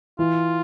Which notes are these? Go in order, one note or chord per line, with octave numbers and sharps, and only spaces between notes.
E3 F4